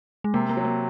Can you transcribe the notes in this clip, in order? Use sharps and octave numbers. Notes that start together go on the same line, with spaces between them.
G#3
C3 A#3
A#3
F#3
A#3